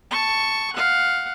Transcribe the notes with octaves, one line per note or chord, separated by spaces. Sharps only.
A5 C#6
F5 F#5